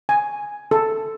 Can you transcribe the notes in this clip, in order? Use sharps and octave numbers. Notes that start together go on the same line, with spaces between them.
G#5
A4